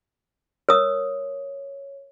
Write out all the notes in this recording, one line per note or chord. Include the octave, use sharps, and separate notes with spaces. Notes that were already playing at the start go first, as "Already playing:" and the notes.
A#4 C#5 D#6